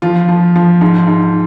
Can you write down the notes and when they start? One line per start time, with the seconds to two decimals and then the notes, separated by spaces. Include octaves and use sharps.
0.02 F3 F4
0.28 F3
0.56 F3
0.81 G#2
1.07 G#2